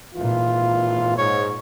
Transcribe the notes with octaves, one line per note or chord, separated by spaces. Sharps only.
G#1 A#2 E3 F4
G#2 C#5